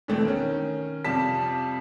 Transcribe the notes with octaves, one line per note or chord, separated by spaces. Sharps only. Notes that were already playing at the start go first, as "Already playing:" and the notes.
B2 D3 E3 A3 C4
D#3 C#4
F2 C3 F3 G3 A5 B6